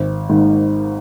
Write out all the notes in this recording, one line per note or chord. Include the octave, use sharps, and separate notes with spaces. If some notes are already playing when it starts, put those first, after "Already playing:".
Already playing: G#1
G#2 D#3